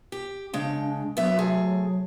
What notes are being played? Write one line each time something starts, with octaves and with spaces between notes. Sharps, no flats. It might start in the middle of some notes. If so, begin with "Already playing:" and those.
G4
C#3 G#3 D4 G5
F#3 B3 E5
C3 A3 G#4